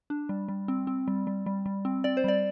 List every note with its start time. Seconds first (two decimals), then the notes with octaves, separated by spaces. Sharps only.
0.10 D4
0.29 G3
0.48 G3
0.68 C4
0.87 C4
1.08 G3
1.27 G3
1.46 G3
1.66 G3
1.85 C4
2.04 C4 D5
2.17 C5
2.24 G3 D5